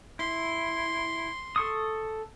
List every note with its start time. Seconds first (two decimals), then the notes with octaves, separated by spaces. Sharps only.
0.19 E4 C6
1.56 A4 C#6 D#6